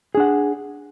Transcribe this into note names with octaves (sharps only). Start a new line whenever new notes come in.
D4 G#4 F#5